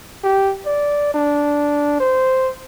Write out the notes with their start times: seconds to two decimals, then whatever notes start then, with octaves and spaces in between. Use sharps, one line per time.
0.24 G4
0.66 D5
1.14 D4
2.00 C5